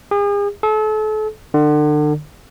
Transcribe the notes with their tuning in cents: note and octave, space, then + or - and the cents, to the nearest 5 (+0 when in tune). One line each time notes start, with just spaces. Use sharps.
G#4 -40
A4 -35
D3 +35